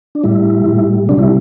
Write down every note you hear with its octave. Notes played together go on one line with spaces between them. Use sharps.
D4
A2 G3 E4
A2 G3
C3 G3 D4
E4